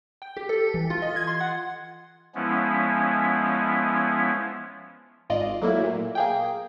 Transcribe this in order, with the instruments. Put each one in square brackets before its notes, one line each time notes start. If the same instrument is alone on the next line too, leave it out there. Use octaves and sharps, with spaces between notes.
[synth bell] G5
G4
A4
E3
F4
D#5
G#6
C6
F#5
[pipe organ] F3 G#3 B3 C#4 E4
[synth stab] G#1 F4 D5 D#5
F#3 A3 A#3 E4
A#2
A#3 G#4 G5